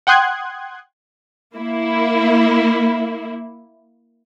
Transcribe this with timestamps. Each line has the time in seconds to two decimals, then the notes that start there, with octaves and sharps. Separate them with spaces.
0.07 F#5 G5 C6 D#6 F#6 G#6
1.56 A#3 E4